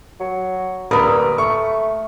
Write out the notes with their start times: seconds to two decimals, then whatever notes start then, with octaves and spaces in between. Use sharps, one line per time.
0.20 F#3
0.91 D1 A#1 G2 A#4 B5 D#6
1.38 A3 C#6